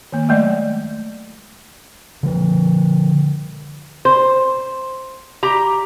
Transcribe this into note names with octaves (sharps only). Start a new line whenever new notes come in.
D#3 A#3
F#3 G#3 A3 D5 D#5
D3 F3
C5
G4 A#5